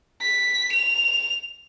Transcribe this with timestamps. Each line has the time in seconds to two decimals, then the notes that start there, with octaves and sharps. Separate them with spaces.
0.22 B6
0.72 F7